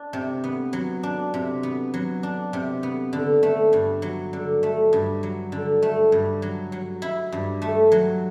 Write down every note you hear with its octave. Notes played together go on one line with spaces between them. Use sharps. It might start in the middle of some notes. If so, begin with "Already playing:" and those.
Already playing: D4
C3
B3
F#3
D4
C3
B3
F#3
D4
C3
B3
D3
A3
G2
F#3
D3
A3
G2
F#3
D3
A3
G2
F#3
F#3
E4
G2
A3
F#3